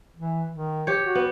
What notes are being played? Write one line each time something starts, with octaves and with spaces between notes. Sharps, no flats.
E3
D#3
G4 C#5
F#4
B3